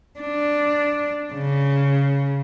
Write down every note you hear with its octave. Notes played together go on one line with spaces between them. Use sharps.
D4
C#3